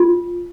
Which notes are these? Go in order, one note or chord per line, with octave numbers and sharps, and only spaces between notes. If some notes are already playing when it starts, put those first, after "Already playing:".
Already playing: F4